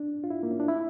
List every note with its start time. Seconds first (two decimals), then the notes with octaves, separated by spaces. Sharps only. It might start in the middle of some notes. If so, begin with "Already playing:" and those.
Already playing: D4
0.24 F4
0.30 E4
0.43 A#3
0.51 C#4
0.60 D4
0.68 E4